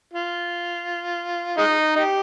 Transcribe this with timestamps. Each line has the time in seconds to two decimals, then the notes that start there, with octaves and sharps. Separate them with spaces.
0.14 F4
1.58 G#3 D#4
1.95 D#4 G4